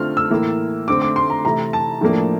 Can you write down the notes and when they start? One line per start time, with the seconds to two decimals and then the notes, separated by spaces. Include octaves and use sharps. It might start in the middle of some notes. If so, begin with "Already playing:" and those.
Already playing: D3 A3 C4 F4 F6
0.17 E6
0.30 A2 E3 A#3
0.88 D3 A3 C4 D6
1.02 D6
1.16 C6
1.30 A#5
1.44 C3 E3 A3 E4 A#5
1.73 A5
2.01 A2 F3 A#3 D4